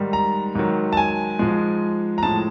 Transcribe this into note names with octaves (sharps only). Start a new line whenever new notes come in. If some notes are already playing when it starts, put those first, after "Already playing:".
Already playing: G#2 D#3 G3
A#5
G#2 D#3 F#3
A5
G#5
G#2 F3 G#3
A#5
A2 F3 G#3 A5